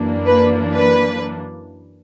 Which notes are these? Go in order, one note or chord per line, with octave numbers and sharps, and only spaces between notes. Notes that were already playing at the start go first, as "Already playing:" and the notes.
Already playing: F#2 E3 A#3 D4
B4
B4